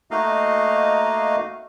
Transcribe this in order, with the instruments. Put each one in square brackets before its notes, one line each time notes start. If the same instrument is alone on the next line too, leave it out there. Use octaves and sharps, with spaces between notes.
[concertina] A3 A#3 D#4 F#4 D#5 F5